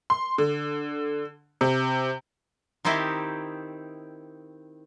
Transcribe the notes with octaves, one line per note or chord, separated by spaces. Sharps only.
C6
D3
C3
D#3 C4 D#4 E4 G4